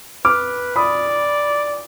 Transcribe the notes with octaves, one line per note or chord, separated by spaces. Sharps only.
B4 D6 F6
D5 B5 D#6